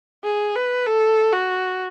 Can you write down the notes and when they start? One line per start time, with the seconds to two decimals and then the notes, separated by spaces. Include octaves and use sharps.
0.24 G#4
0.56 B4
0.86 A4
1.33 F#4